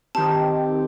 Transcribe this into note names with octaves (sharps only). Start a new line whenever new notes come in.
D#3 C4 G4 A5